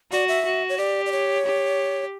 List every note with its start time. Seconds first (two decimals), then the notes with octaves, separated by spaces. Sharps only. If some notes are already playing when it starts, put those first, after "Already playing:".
0.12 F#4 D5
0.28 E5
0.45 F#4
0.69 C#5
0.78 G4 D5
1.06 D5
1.12 C#5
1.46 G4